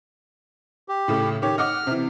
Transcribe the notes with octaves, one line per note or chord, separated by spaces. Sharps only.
G4
A2 C#3 A3
D#3 G4 C#5
D#5 F#5 D6 F6
C3 E3